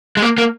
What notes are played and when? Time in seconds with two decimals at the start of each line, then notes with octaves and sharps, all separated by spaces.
0.17 G#3
0.22 A#3
0.38 A#3